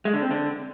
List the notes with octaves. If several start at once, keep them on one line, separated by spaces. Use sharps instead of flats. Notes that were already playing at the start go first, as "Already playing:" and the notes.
G#3
D3
C4
D3